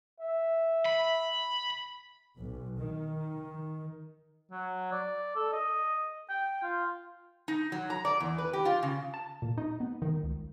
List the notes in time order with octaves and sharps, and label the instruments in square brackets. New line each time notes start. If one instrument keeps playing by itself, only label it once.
[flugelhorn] E5
[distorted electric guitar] B5
[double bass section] B1
D#3
[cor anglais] F#3
D5
A4
D#5
G5
F4
[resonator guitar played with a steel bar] D#4
F#3
A#5
D5
E2
B4
G4
F4
C#3
[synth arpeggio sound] A5
A#2
D#4
B3
D#3
C#2